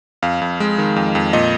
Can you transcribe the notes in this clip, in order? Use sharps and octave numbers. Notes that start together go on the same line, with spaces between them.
F2 F5
F2
G#3
D#3
F2
F2
A#2 D#5